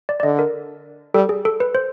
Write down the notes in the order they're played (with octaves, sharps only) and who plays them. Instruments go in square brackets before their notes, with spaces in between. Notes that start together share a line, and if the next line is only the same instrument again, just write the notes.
[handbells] D5
D5
[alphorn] D3 [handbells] D#5
[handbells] A#4
[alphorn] G3 [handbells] A4
[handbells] G#4
A4
B4
C5